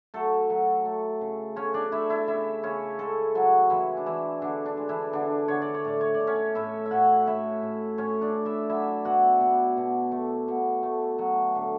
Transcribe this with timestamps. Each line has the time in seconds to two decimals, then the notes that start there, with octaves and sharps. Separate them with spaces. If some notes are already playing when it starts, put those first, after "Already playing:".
0.14 F#3 A3 A4
0.50 F#3
0.85 A3
1.21 C#3
1.56 A3 C#4 C#5
1.74 D4 D5
1.92 A3 E4 E5
2.09 E4 E5
2.28 C#3 E4 E5
2.63 C#3 C#4 C#5
2.99 G#3 A3 A4
3.35 F#3 G#3 F#4
3.70 E3 G#3 E4
3.97 D4
4.06 E3 G#3 E4
4.42 D3 D4
4.66 D4
4.77 G#3
4.89 E3 E4
5.13 D3 D4
5.48 D3 C#5
5.62 D5
5.74 C#5
5.85 A2 D5
6.01 C#5
6.14 D5
6.20 A3
6.27 C#4 C#5
6.55 A2 E4 E5
6.86 E5
6.91 A2 F#4 F#5
7.27 A2 E4 E5
7.63 A2
7.98 A2 C#4 C#5
8.21 D4 D5
8.34 A3
8.45 E4 E5
8.69 F#3 E4 E5
9.05 B2 F#4 F#5
9.41 B2
9.77 B2
10.12 A3
10.48 B2
10.83 A3
11.18 F#3
11.55 D3